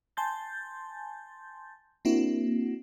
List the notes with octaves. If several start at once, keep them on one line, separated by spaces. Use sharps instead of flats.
G#5 A5 C6 G6 A6
A#3 C4 D4 E4 F#4